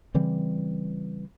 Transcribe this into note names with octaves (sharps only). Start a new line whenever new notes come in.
C#3 E3 G3 C4